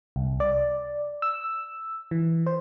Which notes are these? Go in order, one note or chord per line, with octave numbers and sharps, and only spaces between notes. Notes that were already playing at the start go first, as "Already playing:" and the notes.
C2
D5
E6
E3
C5